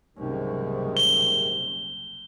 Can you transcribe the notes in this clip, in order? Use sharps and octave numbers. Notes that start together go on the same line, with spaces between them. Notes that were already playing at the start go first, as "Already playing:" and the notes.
F#1 C2 G#2 C3 D#3
G7